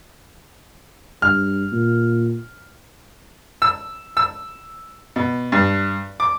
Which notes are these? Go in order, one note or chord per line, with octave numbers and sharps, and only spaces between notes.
G2 F6
A#2
E6
E6
B2
G2
D6